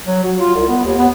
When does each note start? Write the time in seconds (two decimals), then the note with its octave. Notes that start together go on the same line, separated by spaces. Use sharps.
0.07 F#3
0.24 F#4
0.40 F4
0.55 C2
0.68 B3
0.85 D#2
0.99 B3